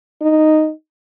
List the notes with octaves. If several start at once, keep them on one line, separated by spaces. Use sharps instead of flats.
D#4